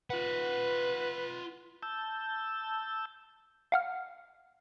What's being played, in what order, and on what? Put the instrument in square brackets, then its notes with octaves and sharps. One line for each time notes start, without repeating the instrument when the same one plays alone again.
[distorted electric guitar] F4 F#5 [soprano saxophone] B4
[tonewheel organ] A5 E6 G6
[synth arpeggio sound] F5 F#5 F6